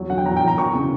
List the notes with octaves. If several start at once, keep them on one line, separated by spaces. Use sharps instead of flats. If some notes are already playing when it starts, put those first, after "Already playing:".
Already playing: E2 F#3
D3 F#5
G5
E2 A#5
G5
E2
A#5
E3 C#6
C#3